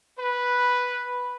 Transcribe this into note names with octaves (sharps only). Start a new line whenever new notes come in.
B4